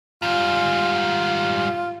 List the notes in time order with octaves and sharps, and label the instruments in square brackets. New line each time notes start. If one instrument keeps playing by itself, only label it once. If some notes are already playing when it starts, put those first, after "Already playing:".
[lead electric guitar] G#2 G3 [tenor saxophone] F4